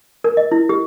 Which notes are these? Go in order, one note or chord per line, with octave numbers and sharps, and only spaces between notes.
A#4
D#5
E4
G4